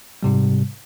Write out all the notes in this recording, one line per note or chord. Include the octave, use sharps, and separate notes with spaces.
G#2 C3 G3